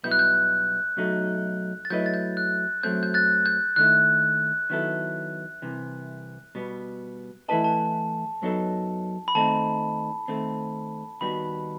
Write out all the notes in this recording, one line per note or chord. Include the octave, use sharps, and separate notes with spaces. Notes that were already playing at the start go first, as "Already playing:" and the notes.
B1 B2 G3 B3 E4 G6
F#6
G6
B1 B2 F#3 A3 D#4
A6
F#3 A3 E4 B4 D#5 G6
A6
G6
F#6
F#2 F#3 A3 C4 G6
G6
F#6 A6
G6
D#2 D#3 A3 E4 F#6
D#3 F#3 B3 E4 A4
C2 C3 E3
B2 G3 B3
E3 A3 E4 B4 D#5 A5
A5
F#2 F#3 B3 D#4 A4
B5
D#3 A3 C4 D#4 A5
D#3 A3 C4
D#2 D#3 G3 B3 F#4 B5